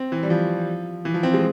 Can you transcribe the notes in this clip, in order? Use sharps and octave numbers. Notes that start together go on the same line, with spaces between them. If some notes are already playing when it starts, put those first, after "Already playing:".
Already playing: C4
E3
G3
F3
E3
F3
C4
G#3